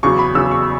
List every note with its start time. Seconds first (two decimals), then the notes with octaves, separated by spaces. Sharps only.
0.03 E2 C#3 F#3 C#6
0.19 B5
0.35 E2 C#3 F#3 E6
0.51 C#6